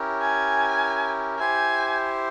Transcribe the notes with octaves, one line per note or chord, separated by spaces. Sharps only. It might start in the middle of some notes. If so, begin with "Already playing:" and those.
Already playing: C#4 E4 G4 A#4
G#5
E4 G4 C5 G#5